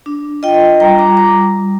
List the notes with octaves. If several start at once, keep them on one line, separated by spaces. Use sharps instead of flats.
D4
F4 D#5 G5
G3 G5 A#5
A#5 D6
G3 A#5 D6